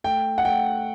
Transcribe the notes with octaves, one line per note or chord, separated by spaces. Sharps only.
A3 G5
F#5
A3 G5